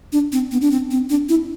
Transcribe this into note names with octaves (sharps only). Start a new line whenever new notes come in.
D4
C4
B3
D4
C4
C4
D4
E4